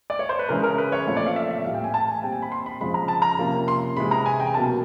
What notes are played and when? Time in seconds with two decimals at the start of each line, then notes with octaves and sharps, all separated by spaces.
0.10 D5
0.19 C#5
0.29 C5
0.39 B4
0.49 C#3 E3 G#3 C#4 A#4
0.63 A#4
0.78 B4
0.92 C#5
1.07 A#2 F3 A3 C4 C#5
1.17 D5
1.26 F5
1.36 E5
1.51 E5
1.65 A2 E3 G3 F5
1.74 G5
1.84 G#5
1.94 A5
2.09 G#5
2.23 A#2 G3 C4 G5
2.32 G#5
2.42 B5
2.52 C6
2.66 B5
2.80 F2 C#3 F3 G#3 B5
2.94 A#5
3.08 A5
3.22 A#5
3.39 C3 F3 A#3 C#4
3.68 C6
3.97 C3 E3 G#3 B5
4.11 A#5
4.26 G#5
4.40 G5
4.47 G#5
4.54 B2 F#3 A#3 C#4 A5